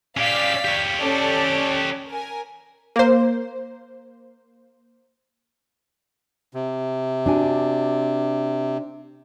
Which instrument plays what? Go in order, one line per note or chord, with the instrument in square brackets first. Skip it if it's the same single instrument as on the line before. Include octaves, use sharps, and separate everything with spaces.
[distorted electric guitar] C#4 G4 [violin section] D5 F5 B6
[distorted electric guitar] G4 C#5
[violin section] C#4 A4 D5
A#4 G#5
[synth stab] A#3 C5
[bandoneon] C3
[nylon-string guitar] D4 F#4 G#5